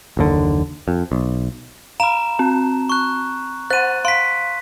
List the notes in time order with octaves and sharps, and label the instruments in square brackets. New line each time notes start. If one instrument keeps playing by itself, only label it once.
[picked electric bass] F#1 D#2 D3
F2
B1
[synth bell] F5 B5 [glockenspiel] A#5 E7
[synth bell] C4
[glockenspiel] C#6 F#6
[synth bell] C5 F#5 [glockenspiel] F#6 D#7
[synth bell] F5 [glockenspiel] C6 B6